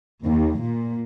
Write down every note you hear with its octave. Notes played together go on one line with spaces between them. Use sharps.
D#2
A#2